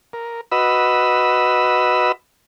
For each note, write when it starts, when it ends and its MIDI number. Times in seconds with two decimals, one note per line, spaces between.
0.13 0.41 70
0.52 2.12 66
0.52 2.12 71
0.52 2.12 75
0.52 2.12 83
0.52 2.12 88